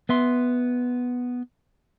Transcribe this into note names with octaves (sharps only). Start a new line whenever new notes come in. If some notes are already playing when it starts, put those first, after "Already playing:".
B3 E5 C6